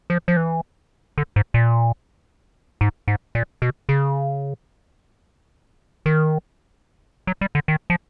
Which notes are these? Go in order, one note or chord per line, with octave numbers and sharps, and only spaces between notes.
F3
F3
E3
D3
G#2
A#2
G#2
G#2
A#2
B2
C#3
D#3
F#3
G3
D3
D#3
F3